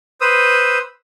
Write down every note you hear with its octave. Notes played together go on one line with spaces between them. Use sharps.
B4 C5 D#6 E6